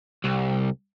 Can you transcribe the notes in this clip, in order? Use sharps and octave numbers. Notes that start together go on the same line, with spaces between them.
C2